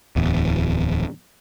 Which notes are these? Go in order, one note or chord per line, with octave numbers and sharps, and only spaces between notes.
D1 E2